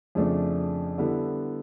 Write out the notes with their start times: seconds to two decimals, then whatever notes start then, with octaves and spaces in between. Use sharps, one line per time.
0.15 F2 C#3 F3 A3 D4
0.98 D3 G3 B3 E4 A4